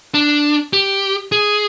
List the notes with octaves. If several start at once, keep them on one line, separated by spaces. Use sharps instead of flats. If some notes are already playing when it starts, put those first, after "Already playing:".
D4
G4
G#4